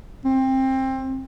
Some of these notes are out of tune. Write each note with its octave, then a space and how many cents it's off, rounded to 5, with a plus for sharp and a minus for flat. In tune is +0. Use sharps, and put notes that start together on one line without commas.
C4 +20